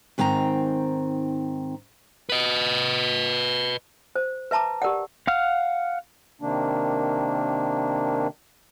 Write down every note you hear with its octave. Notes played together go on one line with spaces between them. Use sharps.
G#2 D#3 C4 G#5 A#5
B4 D#5
C5
B4 E5 A5 A#5 D6
G4 A#4 D5 F#5
F5 F#5 F6
C3 D#3 A#3 D4